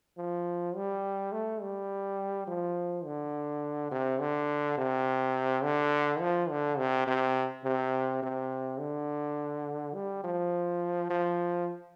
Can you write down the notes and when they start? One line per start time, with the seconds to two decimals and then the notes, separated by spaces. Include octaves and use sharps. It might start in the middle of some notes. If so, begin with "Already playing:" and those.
0.18 F3
0.76 G3
1.32 A3
1.61 G3
2.48 F3
3.05 D3
3.92 C3
4.20 D3
4.78 C3
5.63 D3
6.21 F3
6.50 D3
6.78 C3
7.07 C3
7.64 C3
8.23 C3
8.80 D3
9.95 G3
10.24 F3
11.10 F3